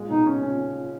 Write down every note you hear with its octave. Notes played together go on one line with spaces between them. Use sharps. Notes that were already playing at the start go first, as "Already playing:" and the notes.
Already playing: A#2 G#3
B2 D#4
C#4
C#4